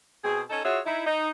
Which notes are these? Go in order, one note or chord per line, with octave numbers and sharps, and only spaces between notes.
B2 C4 G#4
C#4 D#4 A4
F4 F#4 G#4 C#5 E5
D#4 E4
D#4